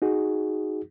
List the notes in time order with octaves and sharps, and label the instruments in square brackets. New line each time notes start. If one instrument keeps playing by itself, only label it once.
[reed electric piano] D#4 F#4 G#4